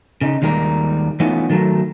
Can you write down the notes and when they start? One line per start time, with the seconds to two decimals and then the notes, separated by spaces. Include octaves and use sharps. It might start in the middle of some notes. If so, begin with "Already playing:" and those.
0.21 C#3 D#4
0.42 D#2 D#3 G3 G#3 A#4
1.20 E3 A3 B3 C#4 D#4 F4
1.50 D#3 F#3 A3 A#4